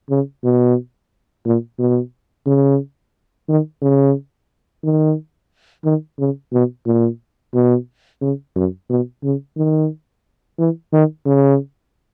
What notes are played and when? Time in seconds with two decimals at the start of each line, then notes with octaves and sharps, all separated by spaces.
0.10 C#3
0.44 B2
1.46 A#2
1.79 B2
2.47 C#3
3.49 D#3
3.82 C#3
4.84 D#3
5.85 D#3
6.19 C#3
6.53 B2
6.86 A#2
7.54 B2
8.22 C#3
8.56 F#2
8.90 B2
9.24 C#3
9.57 D#3
10.59 E3
10.93 D#3
11.26 C#3